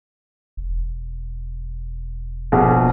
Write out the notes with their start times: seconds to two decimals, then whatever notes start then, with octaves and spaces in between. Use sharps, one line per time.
0.57 E1
2.52 A#1 B2